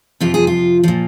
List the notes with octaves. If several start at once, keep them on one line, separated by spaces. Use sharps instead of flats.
F2 C3 F3 F4
G#4
F4
A#2 F3